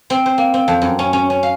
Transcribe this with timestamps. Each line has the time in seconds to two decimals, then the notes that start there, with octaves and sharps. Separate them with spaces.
0.10 C4
0.26 C5
0.38 A#3
0.54 C4
0.68 F2
0.82 F#2
0.99 C#4
1.13 C#4
1.30 C#4
1.43 F5